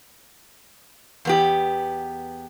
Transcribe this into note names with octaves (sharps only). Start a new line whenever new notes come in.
E2 B3 G4